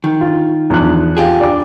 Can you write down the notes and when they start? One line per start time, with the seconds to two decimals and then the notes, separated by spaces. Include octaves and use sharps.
0.04 D#3
0.21 F4
0.70 E2 F3 F#6
1.17 F4 G4 G#4
1.40 D5 D6